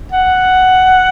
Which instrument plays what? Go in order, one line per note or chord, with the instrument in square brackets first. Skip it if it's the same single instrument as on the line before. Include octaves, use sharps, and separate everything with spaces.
[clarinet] F#5